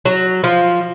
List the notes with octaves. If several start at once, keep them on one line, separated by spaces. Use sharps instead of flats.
F#3
F3